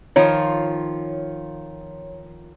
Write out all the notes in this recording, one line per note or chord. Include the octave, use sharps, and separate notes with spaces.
D#3 F3 F4 C#5